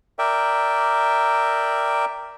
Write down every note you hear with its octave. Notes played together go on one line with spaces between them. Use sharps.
A#4 D5 E5 G5